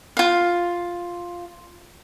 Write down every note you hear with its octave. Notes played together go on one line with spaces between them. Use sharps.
F4 F5